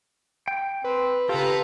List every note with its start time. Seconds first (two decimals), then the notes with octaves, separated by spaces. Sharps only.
0.48 G5
0.84 C4 B4
1.29 C#3 F4 G4 A4 B4 F5 A#5